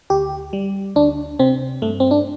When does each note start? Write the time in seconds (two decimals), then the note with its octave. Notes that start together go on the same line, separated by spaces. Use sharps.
0.10 D2 G4
0.53 G3
0.95 D2 D4
1.39 C3 C4
1.82 G2 A3
2.00 C4
2.11 D4